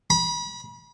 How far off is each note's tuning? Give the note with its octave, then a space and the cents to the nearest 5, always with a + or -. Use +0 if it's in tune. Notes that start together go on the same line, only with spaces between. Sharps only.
B5 -35